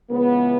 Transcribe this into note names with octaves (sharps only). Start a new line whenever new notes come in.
C#2 C#3 E3 B3